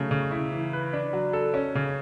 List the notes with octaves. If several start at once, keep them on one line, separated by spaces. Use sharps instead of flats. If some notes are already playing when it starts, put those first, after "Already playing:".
Already playing: C#3 F#3 A3
C#3
E4
E3
B4
D4
F#3
A4
C#4
C#3